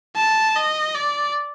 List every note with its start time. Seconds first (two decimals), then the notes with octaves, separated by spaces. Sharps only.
0.16 A5
0.56 D#5
0.95 D5